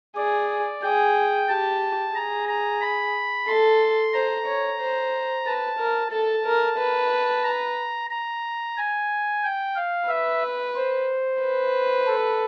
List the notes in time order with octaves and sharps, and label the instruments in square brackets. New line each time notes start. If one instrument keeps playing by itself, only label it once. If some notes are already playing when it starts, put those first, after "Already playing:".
[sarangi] G#4 [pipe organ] D5
[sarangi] G#4 [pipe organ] G5
[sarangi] G4 [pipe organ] A5
[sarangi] G#4 [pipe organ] A#5
[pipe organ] A#5
B5
[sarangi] A4 [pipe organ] C6
[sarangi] C5 [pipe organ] A#5
[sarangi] C#5
C5
[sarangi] B4 [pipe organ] A5
[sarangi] A#4
[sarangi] A4 [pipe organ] A5
[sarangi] A#4
B4
[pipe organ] A#5
A#5
G#5
G5
F5
[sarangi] B4 [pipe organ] E5
[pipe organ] C5
[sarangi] B4
[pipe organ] A4